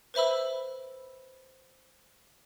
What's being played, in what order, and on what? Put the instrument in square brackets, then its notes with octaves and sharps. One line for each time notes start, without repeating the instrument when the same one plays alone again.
[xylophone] B4 C5 E5 B5 E6